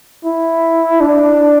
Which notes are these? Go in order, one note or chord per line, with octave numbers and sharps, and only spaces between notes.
E4
D4